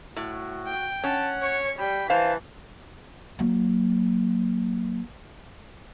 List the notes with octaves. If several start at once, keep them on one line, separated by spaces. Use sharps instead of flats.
A2 F#4
G5
C#4 F#5 A5
C#5 C#6
G3 G5 B5
E3 B4 C5 F5 A5
F#3 A#3